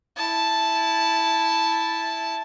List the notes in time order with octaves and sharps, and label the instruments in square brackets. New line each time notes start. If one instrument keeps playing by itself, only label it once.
[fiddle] E4 A5